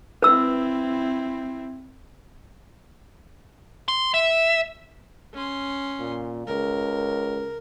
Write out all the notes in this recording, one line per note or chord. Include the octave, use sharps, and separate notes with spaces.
C4 E4 B4 E6
C6
E5
C#4 C6
A#2
C#2 A#4